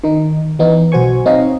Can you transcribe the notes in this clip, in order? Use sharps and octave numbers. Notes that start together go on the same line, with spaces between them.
D#3 D#4
E3 B3 D#4
B1 F#4 C5 G#5 C#6
C4 D#4 C#5 D#5 F5